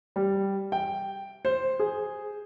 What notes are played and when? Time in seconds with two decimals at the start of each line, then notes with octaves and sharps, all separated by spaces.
0.16 G3
0.72 G5
1.45 C5
1.79 G#4